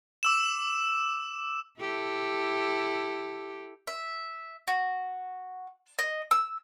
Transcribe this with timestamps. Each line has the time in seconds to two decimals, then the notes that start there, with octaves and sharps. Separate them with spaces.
0.23 D6 E6 E7
1.79 E4 G4 A4
3.87 E5
4.68 F#4
5.99 D#5
6.31 E6